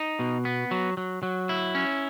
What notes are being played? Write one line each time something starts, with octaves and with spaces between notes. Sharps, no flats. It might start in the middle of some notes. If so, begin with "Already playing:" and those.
Already playing: D#4
B2
B3
F#3
F#3
F#3
E4
C#4